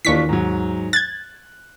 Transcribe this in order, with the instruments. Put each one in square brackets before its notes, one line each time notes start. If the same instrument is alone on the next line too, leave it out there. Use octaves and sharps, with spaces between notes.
[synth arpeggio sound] D#2 C#6 B6 [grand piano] E3 D4 F4
[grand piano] G#2 F#3
[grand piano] F#6 [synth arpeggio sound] G#6 A6